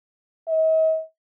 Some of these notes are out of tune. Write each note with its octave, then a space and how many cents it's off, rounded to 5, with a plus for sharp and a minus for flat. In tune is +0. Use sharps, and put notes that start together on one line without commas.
D#5 +45